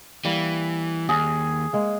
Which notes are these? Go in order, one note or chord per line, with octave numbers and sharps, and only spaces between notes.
E3 G3 A#3
D#2 G#4
G#3 A#3